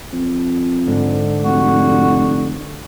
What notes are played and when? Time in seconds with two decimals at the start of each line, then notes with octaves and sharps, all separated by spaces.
0.12 F2
0.88 G#2 D3
1.44 F1 F#4